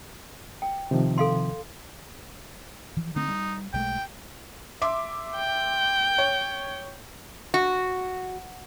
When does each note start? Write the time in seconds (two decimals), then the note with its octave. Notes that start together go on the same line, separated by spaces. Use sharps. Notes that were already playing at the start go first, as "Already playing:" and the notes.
0.62 G5
0.91 C3 D#3 F3
1.18 A4 F5 C6
2.97 E3 F3
3.16 D3 A3 C4 D#4
3.28 G3
3.73 B1 G#3 A3 G5
4.82 E5 C6 D6
5.36 G5
6.18 C#5
7.54 F#4